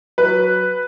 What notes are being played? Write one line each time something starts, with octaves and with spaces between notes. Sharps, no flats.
F#3 B4